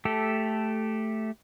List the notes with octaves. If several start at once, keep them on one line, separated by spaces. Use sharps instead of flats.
A3 G4 A4